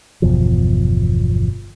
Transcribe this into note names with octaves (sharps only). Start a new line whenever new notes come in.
G1 E2 B2 F3